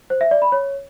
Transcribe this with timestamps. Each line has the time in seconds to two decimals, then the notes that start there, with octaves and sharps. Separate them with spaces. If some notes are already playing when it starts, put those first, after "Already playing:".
0.10 C5
0.21 E5
0.31 D5
0.42 B5
0.52 C#5